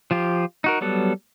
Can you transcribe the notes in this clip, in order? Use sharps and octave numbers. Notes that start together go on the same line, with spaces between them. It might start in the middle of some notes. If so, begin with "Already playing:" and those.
F3 F4 G4
D#4 F#4 A#4
F#3 G3 B3 A4